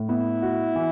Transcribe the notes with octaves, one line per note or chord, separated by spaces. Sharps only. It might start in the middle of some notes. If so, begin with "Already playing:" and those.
Already playing: A2
B3 E4
F#4
E3